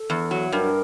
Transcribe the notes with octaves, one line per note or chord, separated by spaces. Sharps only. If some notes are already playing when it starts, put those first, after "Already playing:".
Already playing: A4
E2
F#3
G2 A#4